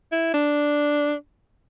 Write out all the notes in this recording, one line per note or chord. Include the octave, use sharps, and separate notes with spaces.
E4
D4